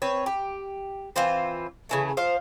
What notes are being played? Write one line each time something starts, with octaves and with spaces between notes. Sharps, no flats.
C4 B4 C#5
G4
E3 C4 F4 C5
C#3 E3 A3
F3 C5 F5